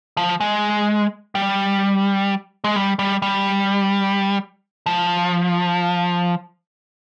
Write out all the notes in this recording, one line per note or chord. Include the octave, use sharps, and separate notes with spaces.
F3
G#3
G3
G#3
G3
G3
G3
F3